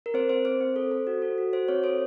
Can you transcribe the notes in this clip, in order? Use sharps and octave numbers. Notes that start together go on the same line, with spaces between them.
A#4
C4 C5
C4 C5
C4 C5
C4
A4
A4
F#4
A4
F#4
F#4 C5
C4 C#5
A4 C5